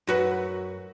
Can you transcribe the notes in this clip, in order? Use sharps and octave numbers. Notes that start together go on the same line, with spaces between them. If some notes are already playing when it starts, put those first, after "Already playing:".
F#2 F#4 B4